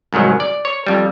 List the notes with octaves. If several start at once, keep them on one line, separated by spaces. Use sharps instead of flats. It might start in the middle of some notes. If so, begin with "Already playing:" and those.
C2 G#2 D#3 F#3
D5
C#5
F2 G3